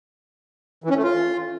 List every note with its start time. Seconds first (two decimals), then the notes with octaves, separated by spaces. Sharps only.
0.84 E3
0.90 C#4
0.97 A3
1.03 F4